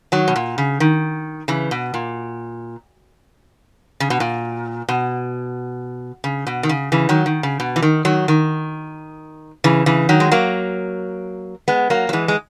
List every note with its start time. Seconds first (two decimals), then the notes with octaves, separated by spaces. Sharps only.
0.12 D#3 F#3
0.28 B2
0.36 A#2
0.58 C#3
0.80 D#3
1.48 C#3 E3
1.71 B2
1.94 A#2
4.00 C#3
4.10 B2
4.20 A#2
4.89 B2
6.24 C#3
6.47 B2
6.63 D#3
6.69 C#3
6.92 C#3 E3
7.09 D#3 F#3
7.26 D#3
7.43 C#3
7.60 B2
7.76 E3
7.82 D#3
8.05 D#3 F#3
8.28 D#3
9.64 C#3 E3
9.86 C#3 E3
10.09 D#3 F#3
10.20 G#3
10.31 F#3 A#3
11.68 G#3 B3
11.90 F#3 A#3
12.09 F#3
12.13 E3 G#3
12.28 G#3